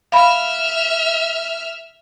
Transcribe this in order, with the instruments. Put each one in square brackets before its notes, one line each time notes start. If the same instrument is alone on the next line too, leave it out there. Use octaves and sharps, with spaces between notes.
[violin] E5 F6 [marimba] F5 B5